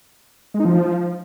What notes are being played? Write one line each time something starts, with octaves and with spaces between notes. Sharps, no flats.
G#3
D#4
F3